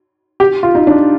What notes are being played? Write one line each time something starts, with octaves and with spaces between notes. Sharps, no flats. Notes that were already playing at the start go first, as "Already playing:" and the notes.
G4
F4
D#4
D4